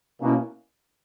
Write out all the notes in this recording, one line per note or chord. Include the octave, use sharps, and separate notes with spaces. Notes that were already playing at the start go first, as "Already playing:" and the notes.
B2 A#3 C#4 E4